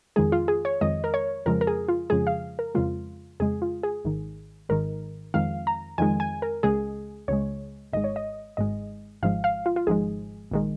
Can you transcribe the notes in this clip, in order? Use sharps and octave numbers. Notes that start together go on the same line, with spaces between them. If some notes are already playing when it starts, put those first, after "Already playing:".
F2 D#3 G#3 G#4
F4
G#4
C#5
F2 D#3 G#3 D#5
A#4
C#5
F2 C#3 F3 G#3 A#4
A#4
G#4
F4
F2 C#3 F3 G#3 G#4
F5
A#4
F2 C#3 G#3 F4
F2 C#3 G#3 G#4
F4
G#4
G#1 G#2 D#3
G#1 G#2 D#3 A#4
F2 D#3 G#3 F5
A#5
F2 D#3 G#3 G#5
G#5
A#4
C#2 C#3 G#3 G#4
C#2 C#3 G#3 C#5
G#1 G#2 G#3 D#5
C#5
D#5
G#1 G#2 G#3 D#5
G#1 G#2 F3 G#3 F5
F5
F4
F4
G#1 G#2 F3 G#3 G#4
A#1 D#3 G#3